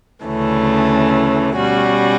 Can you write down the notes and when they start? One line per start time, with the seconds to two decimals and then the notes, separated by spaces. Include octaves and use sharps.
0.24 D2 C#3 E3 A3 C#4
1.56 B2 G3 C#4 F#4